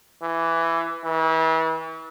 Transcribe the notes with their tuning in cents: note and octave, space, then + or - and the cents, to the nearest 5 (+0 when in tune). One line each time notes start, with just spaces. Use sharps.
E3 +10
E3 -35